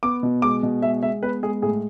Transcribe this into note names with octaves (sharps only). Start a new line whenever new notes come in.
B3 D6
B2
G#3 D6
B2
G#3 E5
G#3 E5
B3 B4
G#3 G#4
A2 G#4